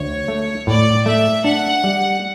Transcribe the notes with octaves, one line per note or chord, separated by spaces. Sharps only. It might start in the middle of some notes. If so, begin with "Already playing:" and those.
Already playing: D2 C#5
A3
A2 D5
A3 E5
D4 F#5
G3